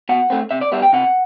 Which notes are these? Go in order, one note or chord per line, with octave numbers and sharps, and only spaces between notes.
B2 F#5
A3 C4
C3 E5
D5
G3 B3 E5
G5
C3 F#5